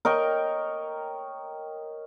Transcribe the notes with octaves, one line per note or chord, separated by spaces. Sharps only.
A#4 C#5 D#5 G5